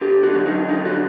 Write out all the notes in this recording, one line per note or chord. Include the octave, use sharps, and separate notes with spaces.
D3 G4
F#4
F#3
D#4
D3 D#4
F#4